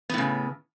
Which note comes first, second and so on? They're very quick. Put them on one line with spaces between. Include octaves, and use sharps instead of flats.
B3 A2 C#3